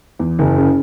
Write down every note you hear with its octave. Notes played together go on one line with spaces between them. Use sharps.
E2
F#1
C#3